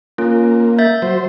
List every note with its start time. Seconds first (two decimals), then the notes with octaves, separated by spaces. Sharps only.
0.18 A#3 C#4 F4
0.79 E5 G6 A6
1.02 F#3 C5